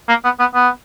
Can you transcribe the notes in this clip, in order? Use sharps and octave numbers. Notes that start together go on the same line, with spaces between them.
A#3
B3
B3
B3